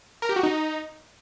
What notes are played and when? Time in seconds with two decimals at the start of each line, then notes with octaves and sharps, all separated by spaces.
0.22 A#4
0.29 G4
0.36 F#4
0.43 D#4